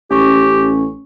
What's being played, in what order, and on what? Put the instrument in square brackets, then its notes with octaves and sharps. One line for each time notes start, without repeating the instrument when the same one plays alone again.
[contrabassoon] A1 [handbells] C#4 C#6 [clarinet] G4